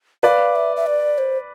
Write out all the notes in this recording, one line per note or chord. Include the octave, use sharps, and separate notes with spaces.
B4 D5 F5
E5
E5
D5
C5